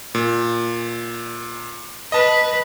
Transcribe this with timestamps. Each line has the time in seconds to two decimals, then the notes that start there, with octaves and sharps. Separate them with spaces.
0.15 A#2
2.12 B4 D#5 A5